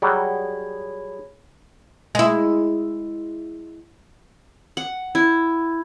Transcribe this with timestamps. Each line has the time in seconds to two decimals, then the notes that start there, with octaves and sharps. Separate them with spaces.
0.02 F#3 G3 G#4 C#5 B5
2.15 G#3 E4
4.77 F#5
5.15 E4